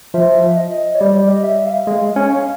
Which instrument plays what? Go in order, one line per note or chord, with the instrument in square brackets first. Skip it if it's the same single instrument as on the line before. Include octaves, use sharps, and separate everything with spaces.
[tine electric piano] F3 [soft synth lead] E5
[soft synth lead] D#5
C#5
[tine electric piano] G3 [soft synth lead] D5
[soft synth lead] D#5
E5
F5
[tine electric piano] G#3
C#4